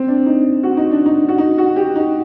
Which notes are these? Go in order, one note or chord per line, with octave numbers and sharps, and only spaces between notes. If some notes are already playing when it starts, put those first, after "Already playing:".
Already playing: C4
D4
D#4
F#4
D#4
D4
D#4
F#4
D#4
F#4
G4
D#4